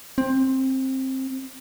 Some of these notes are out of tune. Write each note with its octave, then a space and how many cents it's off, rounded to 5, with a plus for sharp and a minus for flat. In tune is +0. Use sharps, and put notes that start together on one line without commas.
C4 +15